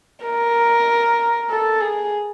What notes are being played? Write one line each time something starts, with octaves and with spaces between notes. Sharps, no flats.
A#4
A4
G#4